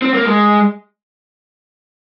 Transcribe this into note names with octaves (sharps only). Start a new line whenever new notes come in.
C4
A#3
G#3